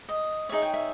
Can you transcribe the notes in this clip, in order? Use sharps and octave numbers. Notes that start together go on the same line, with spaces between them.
D#5
D#4 G#4 C#5 E5
G5
E5